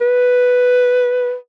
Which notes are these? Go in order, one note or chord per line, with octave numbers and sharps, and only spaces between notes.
B4